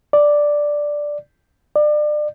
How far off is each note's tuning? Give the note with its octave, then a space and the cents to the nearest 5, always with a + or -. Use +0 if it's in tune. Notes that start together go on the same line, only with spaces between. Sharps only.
D5 +0
D5 +30